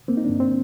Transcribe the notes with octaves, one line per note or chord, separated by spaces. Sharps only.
A#3 C4
D#4
G2 D4
C4